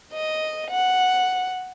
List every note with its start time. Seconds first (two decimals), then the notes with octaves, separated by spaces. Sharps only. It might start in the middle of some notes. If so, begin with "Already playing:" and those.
0.13 D#5
0.71 F#5